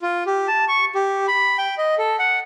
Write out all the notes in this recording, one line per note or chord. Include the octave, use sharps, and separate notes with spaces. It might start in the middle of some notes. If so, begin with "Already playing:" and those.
F4
G4
A5
C#6
G4
B5
G5
D#5
A4
F#5